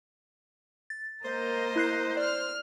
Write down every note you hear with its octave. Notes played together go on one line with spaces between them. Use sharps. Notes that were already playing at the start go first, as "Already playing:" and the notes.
A6
A#3 A#4 C5 D#5
E4 F#6 C7
D5 F6